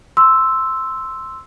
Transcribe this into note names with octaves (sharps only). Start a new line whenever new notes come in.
C6 E6